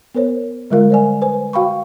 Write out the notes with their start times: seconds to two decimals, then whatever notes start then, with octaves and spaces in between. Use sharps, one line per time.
0.15 B3 A#4 C5 C#5
0.70 D3 G3 G#3 F4 A#4 F5
0.90 C5 D5 G#5
1.22 B4 C5 G#5
1.53 F#4 F5 G5 B5 C#6